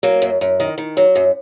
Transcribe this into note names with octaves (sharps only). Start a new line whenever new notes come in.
F#3 A#3
F#2
F#2
D#3
D#3
F#3
F#2